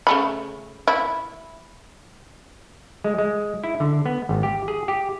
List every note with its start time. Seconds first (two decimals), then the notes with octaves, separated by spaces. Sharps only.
0.07 C#3 A3 B5
0.88 E4
3.04 G#3
3.18 G#3
3.64 E4
3.80 D3
4.06 B3
4.29 G#1
4.43 G4
4.68 G#4
4.88 G4